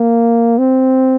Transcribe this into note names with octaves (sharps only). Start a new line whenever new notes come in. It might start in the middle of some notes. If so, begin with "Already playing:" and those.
Already playing: A#3
C4